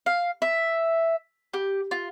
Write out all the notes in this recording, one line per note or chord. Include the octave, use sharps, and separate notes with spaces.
F5
E5
G4
F4